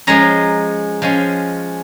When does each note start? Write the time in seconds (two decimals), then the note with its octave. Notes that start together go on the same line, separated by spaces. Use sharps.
0.07 F3 G#3 C#4 A#5
1.02 F3 G#3 C#4